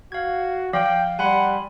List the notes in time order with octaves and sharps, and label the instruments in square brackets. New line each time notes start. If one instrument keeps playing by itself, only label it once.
[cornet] F#4 [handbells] F5 G#6
[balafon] F3 [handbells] F5 [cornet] G5
[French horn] G3 [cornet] F#5 [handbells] G#5 B5 C6